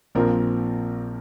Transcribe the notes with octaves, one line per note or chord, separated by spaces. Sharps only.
A#1 A#2 F3 C4 A#4